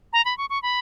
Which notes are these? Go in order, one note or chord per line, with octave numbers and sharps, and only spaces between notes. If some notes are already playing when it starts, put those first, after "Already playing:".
A#5
B5
C#6
C#6
B5